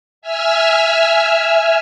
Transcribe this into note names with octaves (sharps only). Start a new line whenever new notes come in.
E5 G#5 E6 F6